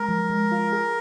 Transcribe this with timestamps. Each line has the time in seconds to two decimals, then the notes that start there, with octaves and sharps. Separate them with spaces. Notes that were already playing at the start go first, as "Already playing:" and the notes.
Already playing: G#3 A#4
0.09 F3
0.30 G#3
0.52 F4
0.72 G#4